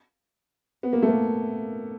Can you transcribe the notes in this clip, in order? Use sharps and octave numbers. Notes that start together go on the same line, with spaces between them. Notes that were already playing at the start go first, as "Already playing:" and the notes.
B3
A#3
A3
A#3